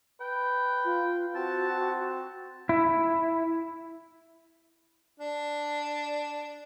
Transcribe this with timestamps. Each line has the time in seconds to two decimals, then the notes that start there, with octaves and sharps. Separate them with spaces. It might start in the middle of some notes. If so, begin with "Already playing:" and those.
0.21 B4 G5
0.84 F4
1.35 C4 F#4 A5
2.69 E4
5.20 D4